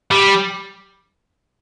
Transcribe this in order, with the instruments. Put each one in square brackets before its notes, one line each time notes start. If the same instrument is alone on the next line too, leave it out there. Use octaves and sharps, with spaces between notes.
[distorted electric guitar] G3